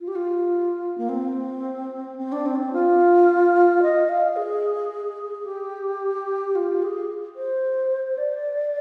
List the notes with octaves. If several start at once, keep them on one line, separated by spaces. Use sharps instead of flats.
F4
G4
F4
A#3
C4
C4
D4
C4
D4
C4
F4
D#5
F5
G#4
G4
F4
G#4
C5
D5